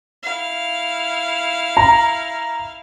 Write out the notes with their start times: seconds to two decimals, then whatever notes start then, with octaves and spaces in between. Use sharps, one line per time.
0.23 E4 F5
1.77 A#5